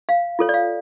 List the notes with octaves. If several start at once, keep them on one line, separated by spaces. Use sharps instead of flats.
F5
F4 A4 C#5
D5
F5